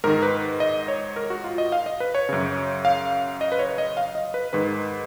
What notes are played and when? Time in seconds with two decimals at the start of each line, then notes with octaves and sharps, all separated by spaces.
0.04 G#2 D#3 A#4
0.22 B4
0.60 D#5
0.88 C#5
1.16 A#4
1.30 F#4
1.44 F4
1.58 D#5
1.72 F5
1.86 D#5
2.00 B4
2.15 C#5
2.29 F#2 C#3
2.85 F5
3.41 D#5
3.52 B4
3.59 C#5
3.78 D#5
3.97 F5
4.15 D#5
4.34 B4
4.53 G#2 D#3 B4